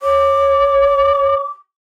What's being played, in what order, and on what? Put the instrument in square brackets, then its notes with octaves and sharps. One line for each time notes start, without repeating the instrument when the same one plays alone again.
[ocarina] C#5 [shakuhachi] D6